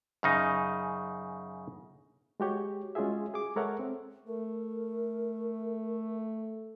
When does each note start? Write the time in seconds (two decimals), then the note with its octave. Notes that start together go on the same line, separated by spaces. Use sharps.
0.23 F#2 C#3 D#4
2.40 G#3 F#4 G4 C#5
2.95 G#3 C#4 F4 F#4 G#4 E5
3.34 G#4 D6
3.56 G#3 A4 A#4 C#5 E5 F#5
3.79 C4
4.28 A3 A#4